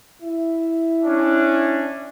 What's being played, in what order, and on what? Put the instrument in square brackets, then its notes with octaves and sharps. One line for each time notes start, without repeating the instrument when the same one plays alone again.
[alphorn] E4
[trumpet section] C#4 D4